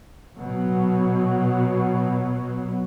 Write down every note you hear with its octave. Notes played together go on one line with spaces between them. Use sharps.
B2 F#3